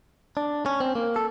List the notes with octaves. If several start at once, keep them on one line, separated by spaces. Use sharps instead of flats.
D4
C#4
C4
A#3
A4